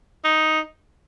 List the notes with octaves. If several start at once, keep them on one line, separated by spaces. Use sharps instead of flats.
D#4